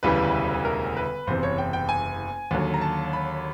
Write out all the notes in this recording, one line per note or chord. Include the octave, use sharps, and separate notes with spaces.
E1 D2 C#3 E3 G3 B4
A#4
B4
F#1 E2 C3 C5
C#5
G5
G5
G#5
D#2 D3 F#3
A#5
A5
B5